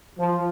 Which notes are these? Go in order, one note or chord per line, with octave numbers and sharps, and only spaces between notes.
F3